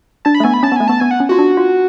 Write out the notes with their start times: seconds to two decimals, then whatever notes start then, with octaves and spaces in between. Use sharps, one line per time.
0.25 D4 A5
0.35 B5
0.40 A3
0.44 B3 G#5
0.54 B5
0.63 C#4 A5
0.72 B3
0.76 A3 G#5
0.88 B3 A5
1.00 B3 G#5
1.11 F#5
1.20 C#4
1.29 F4 F#4
1.39 D4
1.57 F4